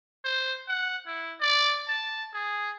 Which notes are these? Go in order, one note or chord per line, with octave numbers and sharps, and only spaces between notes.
C5
F#5
E4
D5
A5
G#4